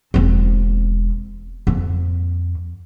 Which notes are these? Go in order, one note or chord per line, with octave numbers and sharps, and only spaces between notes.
E1 C4
F2